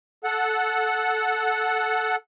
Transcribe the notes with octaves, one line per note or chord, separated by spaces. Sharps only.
A4 F#5